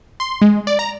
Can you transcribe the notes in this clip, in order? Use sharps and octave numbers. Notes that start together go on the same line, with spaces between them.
C6
G#3
D5
A#5